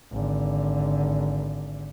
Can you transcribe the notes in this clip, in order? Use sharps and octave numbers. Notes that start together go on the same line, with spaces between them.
G#1 D3